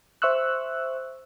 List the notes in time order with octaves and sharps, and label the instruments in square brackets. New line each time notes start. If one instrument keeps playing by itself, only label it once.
[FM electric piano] C5 E5 C#6 E6 F#6